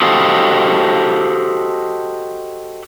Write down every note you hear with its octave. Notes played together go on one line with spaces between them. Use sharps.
F#4 G4 A4 C5 D#5 F5